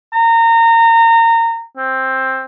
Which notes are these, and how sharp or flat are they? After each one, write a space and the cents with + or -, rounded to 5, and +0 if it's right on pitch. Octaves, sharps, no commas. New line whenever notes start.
A#5 -25
C4 +10